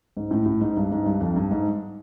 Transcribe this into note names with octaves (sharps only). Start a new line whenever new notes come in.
G#2
A2
A2
G#2
G2
G#2
G2
F2
G2
G#2